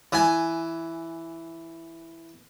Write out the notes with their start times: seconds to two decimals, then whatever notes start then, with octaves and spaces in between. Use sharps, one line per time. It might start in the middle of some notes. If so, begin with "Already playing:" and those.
0.12 E3 G#5